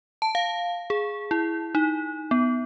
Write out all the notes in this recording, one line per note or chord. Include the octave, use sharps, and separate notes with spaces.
A5
F5
G#4
E4
D#4
B3